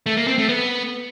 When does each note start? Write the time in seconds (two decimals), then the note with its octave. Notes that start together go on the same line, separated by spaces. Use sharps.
0.06 A3
0.17 A#3
0.27 C4
0.38 A3
0.49 B3